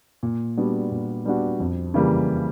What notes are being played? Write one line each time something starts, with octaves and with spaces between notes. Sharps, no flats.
A#2
G3 B3 D4 F#4
A#2
G3 B3 D4 F#4
F2
C#3 E3 G3 A#3